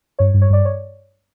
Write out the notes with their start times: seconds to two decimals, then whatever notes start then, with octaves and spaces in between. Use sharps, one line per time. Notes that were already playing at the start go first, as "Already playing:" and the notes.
0.19 G2 C#5
0.34 G2
0.42 C#5
0.50 G2 D5
0.65 C#5